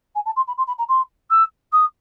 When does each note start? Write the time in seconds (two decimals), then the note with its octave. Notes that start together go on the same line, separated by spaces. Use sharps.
0.15 G#5
0.25 A5
0.36 C6
0.47 B5
0.57 C6
0.67 B5
0.78 A#5
0.88 C6
1.30 E6
1.72 D#6